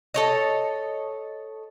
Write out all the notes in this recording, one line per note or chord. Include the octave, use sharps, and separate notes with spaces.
A4 C#5 D#5